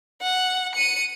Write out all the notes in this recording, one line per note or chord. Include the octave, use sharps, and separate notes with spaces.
F#5
C#7 D#7